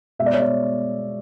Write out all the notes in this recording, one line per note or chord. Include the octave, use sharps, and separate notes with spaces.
B2 G#3 E5
D5
C#5
D5